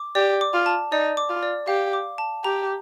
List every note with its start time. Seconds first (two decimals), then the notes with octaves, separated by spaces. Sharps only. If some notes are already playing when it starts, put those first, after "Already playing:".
Already playing: D6
0.15 G4 D5
0.41 D6
0.54 F4
0.66 A5
0.92 D#4 D5
1.17 D6
1.29 F4
1.43 D5
1.67 G4 F5
1.93 D6
2.18 A5
2.44 G4 A#5